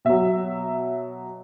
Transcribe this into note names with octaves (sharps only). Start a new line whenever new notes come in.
B2 F#3 E5